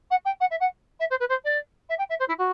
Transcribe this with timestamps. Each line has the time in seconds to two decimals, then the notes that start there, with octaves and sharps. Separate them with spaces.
0.10 F#5
0.25 G5
0.40 F#5
0.50 E5
0.60 F#5
0.99 E5
1.10 C5
1.19 B4
1.29 C5
1.44 D5
1.89 E5
1.98 G5
2.09 E5
2.19 C5
2.28 E4
2.38 F#4